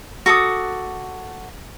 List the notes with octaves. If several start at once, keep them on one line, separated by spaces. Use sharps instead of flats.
F#4 A4 D6 D#6